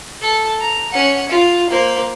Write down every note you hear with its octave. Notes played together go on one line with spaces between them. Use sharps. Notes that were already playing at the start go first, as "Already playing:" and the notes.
A4
A#5
C#4 F#5
F4
A#3 C5